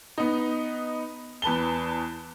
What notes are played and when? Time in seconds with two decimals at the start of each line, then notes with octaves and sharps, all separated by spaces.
0.18 B3 D#4
1.42 E2 B4 A5 G7